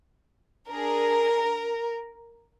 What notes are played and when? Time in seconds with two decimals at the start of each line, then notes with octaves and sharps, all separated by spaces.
0.70 D4 G#4 A#4